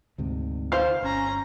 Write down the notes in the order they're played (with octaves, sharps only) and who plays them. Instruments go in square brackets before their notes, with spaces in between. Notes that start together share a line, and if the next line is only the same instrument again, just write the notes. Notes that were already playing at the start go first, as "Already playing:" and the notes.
[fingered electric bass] D2 G#2 C3
[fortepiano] C5 F5
[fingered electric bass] G1 [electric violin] C#4 A#5